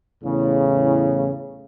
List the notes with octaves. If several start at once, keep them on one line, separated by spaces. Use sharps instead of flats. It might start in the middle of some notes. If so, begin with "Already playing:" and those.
E2 A2 C#3